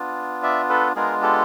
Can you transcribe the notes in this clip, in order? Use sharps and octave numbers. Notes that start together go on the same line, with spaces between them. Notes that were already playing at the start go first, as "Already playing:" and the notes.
Already playing: B3 D4 F4
D5 E5
A4 B4
G#3 B3 D4 F4 G#4 A#4
G4 A4